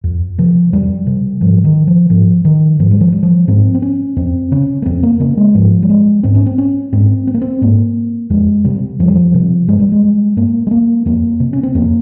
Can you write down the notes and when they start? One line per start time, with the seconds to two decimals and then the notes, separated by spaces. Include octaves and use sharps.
0.04 F2
0.38 C3 F3
0.73 F2 G3
1.07 C3
1.41 G#2 F3
1.64 D#3
1.87 F3
2.10 G#2 F3
2.45 D#3
2.79 G#2 F3
2.91 G3
3.01 F3
3.12 G3
3.23 F3
3.48 G#2 C4
3.75 C4
3.82 C#4
4.16 F2 C4
4.52 C#3 C#4
4.82 A#3
4.86 F2 C4
5.03 A#3
5.20 C#3 A#3
5.37 G#3
5.55 G#2 F3
5.83 G3
5.90 G#3
6.23 G#2 C4
6.35 C#4
6.46 C4
6.58 C#4
6.93 G#2 C4
7.27 C4
7.34 A#3
7.42 C4
7.62 G#2 A#3
8.30 F2 G#3
8.64 C3 G3
8.99 F2 F3
9.08 G3
9.16 F3
9.34 C3
9.68 G2 G#3
9.80 G3
9.92 G#3
10.37 G2 A#3
10.67 G#3
10.71 A#3
11.06 F2 A#3
11.40 C3
11.53 C#4
11.63 C4
11.75 F2 A#3